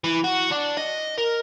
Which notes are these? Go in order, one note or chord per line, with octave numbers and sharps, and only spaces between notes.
E3
F#4
D4
D#5
A#4